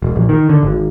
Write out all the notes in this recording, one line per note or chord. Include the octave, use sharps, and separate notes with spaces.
E1
A#1
D#3
D3
G#1